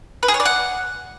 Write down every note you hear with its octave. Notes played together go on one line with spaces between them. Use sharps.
B4
G#4
C#5
D5
F#5